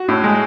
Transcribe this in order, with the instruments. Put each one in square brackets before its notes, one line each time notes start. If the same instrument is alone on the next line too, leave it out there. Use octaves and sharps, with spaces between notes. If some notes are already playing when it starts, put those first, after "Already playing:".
Already playing: [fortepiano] F#4
A2
G#3